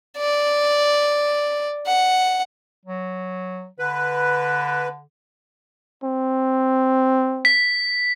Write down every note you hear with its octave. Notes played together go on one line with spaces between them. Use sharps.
D5
F#5
F#3
D3 B4
C4
B6